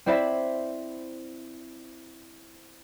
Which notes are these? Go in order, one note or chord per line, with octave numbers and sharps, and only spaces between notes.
C4 E4 C5 D5 E5 B5